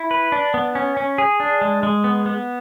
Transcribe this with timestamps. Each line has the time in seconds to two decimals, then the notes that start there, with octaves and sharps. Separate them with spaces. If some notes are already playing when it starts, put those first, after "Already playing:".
Already playing: E4
0.11 B4
0.32 D4
0.54 B3
0.75 C#4
0.97 C#4
1.18 G#4
1.40 D4
1.61 G#3
1.83 G#3
2.04 B3
2.26 B3